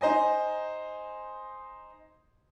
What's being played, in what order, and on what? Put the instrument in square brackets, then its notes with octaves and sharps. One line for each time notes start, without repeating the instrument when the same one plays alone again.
[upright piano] D#4 C5 D#5 G#5